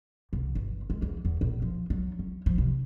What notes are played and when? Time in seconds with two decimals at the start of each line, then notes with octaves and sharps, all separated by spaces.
0.33 C2
0.55 G1
0.90 G#3
1.02 E2
1.25 E2
1.41 A#1
1.62 F3
1.90 F#3
2.19 C#4
2.46 F3
2.58 C3